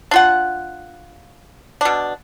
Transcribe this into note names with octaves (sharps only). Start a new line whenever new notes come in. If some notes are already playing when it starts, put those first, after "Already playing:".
D4 F4 F#5
B2 D4